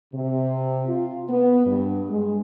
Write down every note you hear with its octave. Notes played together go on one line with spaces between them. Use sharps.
C3
F4
B3
G2
G#3